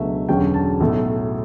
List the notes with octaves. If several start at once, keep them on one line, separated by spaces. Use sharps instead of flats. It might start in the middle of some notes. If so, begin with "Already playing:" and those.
Already playing: C#2 B2 F#3 A3 D4 E5
E1 E2 D3 F#3 C#4 G5
A5
B1 A2 F#3 A3